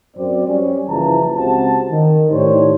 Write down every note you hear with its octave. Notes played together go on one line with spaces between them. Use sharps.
F#2 C4 D5
G3 C#4
F#1 C#3 E3 F3 A5 A#5
C#2 C3 F#4 C5 A5
D#3
A2 D#3 D4 G4 C5 C#5